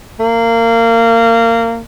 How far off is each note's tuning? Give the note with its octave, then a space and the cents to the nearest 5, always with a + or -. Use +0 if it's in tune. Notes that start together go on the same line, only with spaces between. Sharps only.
A#3 -25